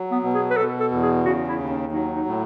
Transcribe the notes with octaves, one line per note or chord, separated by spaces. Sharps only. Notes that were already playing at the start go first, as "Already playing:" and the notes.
Already playing: F#3
B3
B2
G#4
B4
B2 A4
A4
E2
G#4
C#3 F#4
E4
D#2
C#4
F#3 D#4
D#4
A2